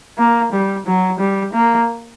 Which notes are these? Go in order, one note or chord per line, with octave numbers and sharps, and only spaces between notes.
A#3
G3
F#3
G3
A#3